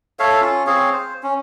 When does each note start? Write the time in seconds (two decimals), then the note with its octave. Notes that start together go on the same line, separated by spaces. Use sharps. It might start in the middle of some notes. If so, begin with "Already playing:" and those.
0.19 A4 C#5 E5 F5
0.41 C#4 F4
0.67 C4 G#4 C#5 F5
0.92 C5
1.23 C#4